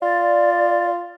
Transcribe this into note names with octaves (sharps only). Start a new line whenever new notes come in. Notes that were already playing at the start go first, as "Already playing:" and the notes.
F4 D5